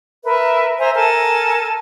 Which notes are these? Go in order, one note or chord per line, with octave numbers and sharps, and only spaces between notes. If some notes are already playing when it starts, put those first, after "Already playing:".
A#4 B4 E5
C5 E5 G#5 A#5
A4 A#4 G#5 A5